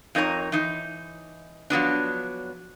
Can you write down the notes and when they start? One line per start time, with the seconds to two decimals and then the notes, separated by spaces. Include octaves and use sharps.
0.15 F2 D#4 A#4 C#5 A#5
0.52 E3 D#4
1.70 F3 F#3 B3 D4